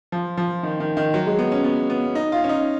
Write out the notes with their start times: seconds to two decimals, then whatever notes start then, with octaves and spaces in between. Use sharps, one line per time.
0.12 F3
0.37 F3
0.63 D#3
0.80 D#3
0.97 D#3
1.14 F#3
1.27 G#3
1.39 B3
1.52 C#4
1.64 B3
1.90 B3
2.15 D#4
2.32 F4
2.44 C#4
2.49 D#4